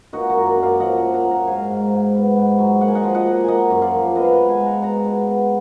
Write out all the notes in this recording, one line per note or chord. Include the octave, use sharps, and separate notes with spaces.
A#3 D#4 F#4
F#4 A#4
F#2
A#4 D5
F#2
D5 F5
F3 D#5 F#5
F#5 A#5
A#3
F#5 A#5
A#3
F#5 A#5
G#2 F5 G#5
G#2
G#2
B3
G#2
F#3
A#3 F#5
G#5
D#5 F#5
F3
D#5 F#5
A#3
A#3 D#5 F#5 G#5
F#2
D5 F5
F3
B3 B4 D#5
F5
D#5 F#5
G#3
F5 G#5
G#3
F#5 A#5
B2 F#5 A#5
B2
B3